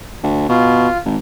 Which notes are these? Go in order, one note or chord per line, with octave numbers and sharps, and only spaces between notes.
D2
B2 F4
G#1